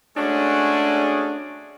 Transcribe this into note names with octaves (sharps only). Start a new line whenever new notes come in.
G#3 A3 C#4 D4 F#4 G#4